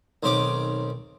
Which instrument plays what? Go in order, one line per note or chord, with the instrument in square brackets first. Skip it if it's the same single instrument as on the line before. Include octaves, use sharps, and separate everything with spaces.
[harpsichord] B1 D#3 C4 C#4 C#5 D6